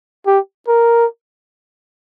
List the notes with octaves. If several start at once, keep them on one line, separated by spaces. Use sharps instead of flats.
G4
A#4